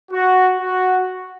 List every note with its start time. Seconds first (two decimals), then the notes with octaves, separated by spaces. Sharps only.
0.12 F#4
0.61 F#4